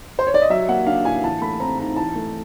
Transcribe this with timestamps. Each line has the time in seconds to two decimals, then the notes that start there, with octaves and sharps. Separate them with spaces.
0.19 C5
0.27 C#5
0.34 D5
0.42 D#5
0.50 F#3 E5
0.68 A#3 F#5
0.86 D4 F5
1.05 A2 G#5
1.23 E3 A5
1.41 A3 B5
1.60 C4 A#5
1.78 G#2 A#5
1.97 E3 A5
2.16 A3